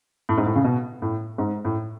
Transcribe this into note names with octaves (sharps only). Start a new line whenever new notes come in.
A2
G#2
A2
C#3
B2
A2
G#2
A2